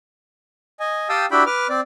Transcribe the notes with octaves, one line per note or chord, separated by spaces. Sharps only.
D#5 G#5
G4 F5 G5 A5 D#6 E6
D4 E4 F#4 G4 G5 B5
B4 D6 F6
C4 D5